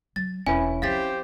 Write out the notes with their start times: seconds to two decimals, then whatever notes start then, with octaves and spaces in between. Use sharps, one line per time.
0.16 F#3 A6
0.47 E1 C#4 E4 B4 G#5
0.82 F3 C4 G4 C5 F5 A6 B6